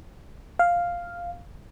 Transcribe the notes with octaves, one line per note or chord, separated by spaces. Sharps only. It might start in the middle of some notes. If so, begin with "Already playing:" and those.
F5